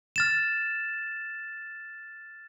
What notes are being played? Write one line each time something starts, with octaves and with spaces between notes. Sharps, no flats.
F6 A6 E7